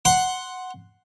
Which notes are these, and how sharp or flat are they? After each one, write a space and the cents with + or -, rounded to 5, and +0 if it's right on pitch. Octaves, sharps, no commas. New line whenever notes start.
F#5 +0 C6 +0